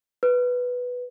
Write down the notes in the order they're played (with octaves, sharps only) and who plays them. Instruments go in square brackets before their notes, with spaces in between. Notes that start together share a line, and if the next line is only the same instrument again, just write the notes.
[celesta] B4